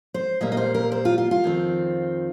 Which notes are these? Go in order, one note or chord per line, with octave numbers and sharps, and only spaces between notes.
C5
A#2 G3 A#3 D#5
D#5
C5
A#4
C5
F4
F4
F4
F2 D#3 C4